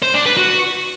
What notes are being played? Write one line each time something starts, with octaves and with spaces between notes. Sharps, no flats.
C5
D4
B4
F#4